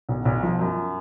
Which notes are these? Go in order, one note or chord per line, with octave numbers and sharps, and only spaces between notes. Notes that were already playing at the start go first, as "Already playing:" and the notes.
B1
B1
F3
F#2